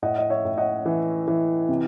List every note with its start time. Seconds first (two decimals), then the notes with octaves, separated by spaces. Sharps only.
0.02 A2 D#5 F#5
0.18 D#5
0.30 C#5 E5
0.45 A2
0.57 D#5 F#5
0.85 E3
1.28 E3
1.69 C3